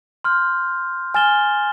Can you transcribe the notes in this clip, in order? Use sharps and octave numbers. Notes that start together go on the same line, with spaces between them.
C6 F6 G6
G#5 F6 A6 E7 G7